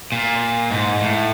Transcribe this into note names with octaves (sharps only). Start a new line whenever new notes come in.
A#2
G#2
A2